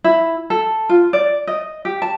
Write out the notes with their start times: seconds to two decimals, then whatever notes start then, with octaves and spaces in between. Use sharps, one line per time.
0.04 E4
0.50 A4
0.89 F4
1.13 D5
1.47 D#5
1.85 G4
2.02 A5